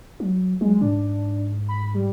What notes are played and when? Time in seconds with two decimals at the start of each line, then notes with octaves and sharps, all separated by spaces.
0.20 F#3
0.61 F#3 G#3
0.81 G#2 D4
1.69 B5
1.94 G3